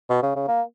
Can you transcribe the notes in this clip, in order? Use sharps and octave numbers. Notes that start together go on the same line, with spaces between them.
B2
C#3
C#3
A#3